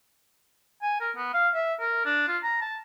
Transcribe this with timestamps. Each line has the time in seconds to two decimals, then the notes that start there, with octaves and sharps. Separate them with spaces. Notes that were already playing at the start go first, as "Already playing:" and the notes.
0.82 G#5
1.01 A#4
1.16 B3
1.34 F5
1.54 E5
1.80 A#4
2.05 D4
2.28 F4
2.43 A#5
2.61 A5